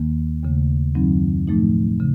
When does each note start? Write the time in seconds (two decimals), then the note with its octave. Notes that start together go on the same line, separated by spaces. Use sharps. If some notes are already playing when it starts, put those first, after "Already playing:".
Already playing: D#2 D#3 A#3
0.43 D#2 C#3 A3
0.95 F#2 D#3 F#3 C4 D#4
1.47 A2 F3 A3 D#4
2.00 C#3